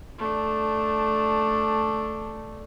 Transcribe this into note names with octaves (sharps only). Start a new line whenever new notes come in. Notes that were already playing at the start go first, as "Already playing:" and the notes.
A3 D4